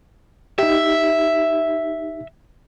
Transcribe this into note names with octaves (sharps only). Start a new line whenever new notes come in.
D#4 G4 E5